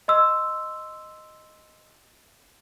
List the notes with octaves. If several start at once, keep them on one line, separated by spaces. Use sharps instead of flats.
D#5 C6 E6